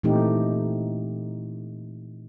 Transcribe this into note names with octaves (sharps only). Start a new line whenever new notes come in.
A#2 E3 A3 C4 D#4 G4